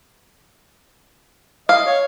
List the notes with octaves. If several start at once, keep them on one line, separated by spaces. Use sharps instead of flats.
D#5 F5
C#5